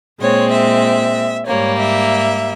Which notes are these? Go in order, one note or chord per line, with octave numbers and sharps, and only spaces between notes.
A#2 G#3 C4 C#5
E5
G#2 G3 A#3 C#5
E5